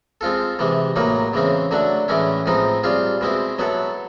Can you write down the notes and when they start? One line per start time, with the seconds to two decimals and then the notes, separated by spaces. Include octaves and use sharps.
0.21 G#3 C4 F4 A4
0.59 C3 E3 G#3
0.96 A2 F#3 A#3 D#4
1.33 C#3 E3 G#3 C4
1.71 D3 F#3 A3 D4
2.08 A2 E3 G#3 C#4 E4
2.46 A2 F3 G#3 C4 D#4
2.84 G3 C4 F4 G#4
3.21 B2 G#3 C4 E4
3.59 F#3 B3 E4 A4